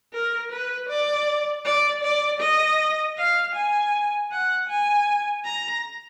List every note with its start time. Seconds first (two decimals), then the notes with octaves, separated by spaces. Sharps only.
0.13 A#4
0.51 B4
0.89 D5
1.65 D5
2.03 D5
2.40 D#5
3.17 F5
3.55 G#5
4.31 F#5
4.69 G#5
5.45 A#5